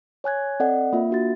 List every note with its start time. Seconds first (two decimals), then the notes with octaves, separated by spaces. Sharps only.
0.24 C#5 G#5 F#6 G#6
0.60 C4 A4 D5 D#5 F#5
0.93 A#3 F4 E5
1.10 D4 F#4 A6